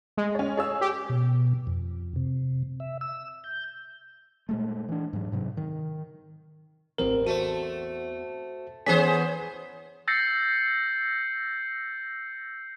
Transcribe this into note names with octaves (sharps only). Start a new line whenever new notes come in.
G#3
C#4 C#5
G#4 C#5 E6
G4
B2
F2
C3
E5
E6
G6
A#2 G#3 A3
E3 D4
G#2 F#3
G#2 C3 F#3
D#3
A1 E2 C4 A#4
A3 F#4 C5
E3 B3 C#4 G#4 B4 C5 G#5 B6
E6 G6 A6 A#6 C7 C#7